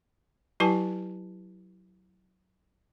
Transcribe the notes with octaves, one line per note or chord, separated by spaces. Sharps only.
F#3 E4 G4 B4 G#5 A5